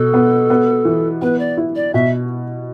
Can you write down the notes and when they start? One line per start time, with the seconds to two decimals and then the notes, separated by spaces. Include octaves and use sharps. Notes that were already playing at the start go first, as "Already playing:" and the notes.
Already playing: B2 A4
0.14 B3
0.50 B3
0.85 E3
1.22 B3 B4
1.39 D5
1.57 E4
1.76 D5
1.94 B2 E5